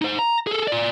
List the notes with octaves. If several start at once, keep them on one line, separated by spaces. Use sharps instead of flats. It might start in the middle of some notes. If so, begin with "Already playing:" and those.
D#4 C5
A#5
G#4 A4
F4 D5